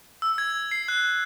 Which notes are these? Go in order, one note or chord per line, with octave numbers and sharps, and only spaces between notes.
E6
G#6
C7
F#6